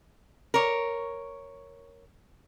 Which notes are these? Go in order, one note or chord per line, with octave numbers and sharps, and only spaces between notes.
A#4 C#5